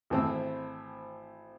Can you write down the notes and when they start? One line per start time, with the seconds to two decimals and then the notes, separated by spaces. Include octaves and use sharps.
0.10 G#1 E3 A3 C4 C5 E6